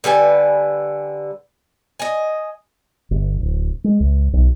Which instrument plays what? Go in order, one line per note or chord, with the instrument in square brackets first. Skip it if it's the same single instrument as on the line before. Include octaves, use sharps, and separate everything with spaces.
[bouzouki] D3 G3 B4 G#5
D#5 G#5
[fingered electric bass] G1
D1
G#3
C#2
B1